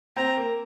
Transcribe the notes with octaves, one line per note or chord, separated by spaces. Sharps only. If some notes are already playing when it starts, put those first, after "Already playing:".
C4 C5 A#5
A#3 A#4